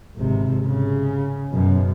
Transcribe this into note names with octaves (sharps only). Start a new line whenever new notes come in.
G#1 C3
C#3
F#2 B2